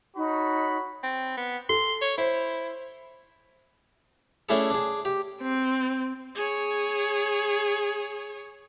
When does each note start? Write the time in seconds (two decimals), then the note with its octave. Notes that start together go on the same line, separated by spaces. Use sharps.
0.16 D#4 F#4 C#5 B5
1.03 C4
1.37 B3
1.69 A4 C6
2.01 C#5
2.18 E4 C5
4.49 A3 C#4 D4 E4 G#4 A4
4.70 D4 G#4
5.05 G4
5.42 C4
6.35 G#4 C#5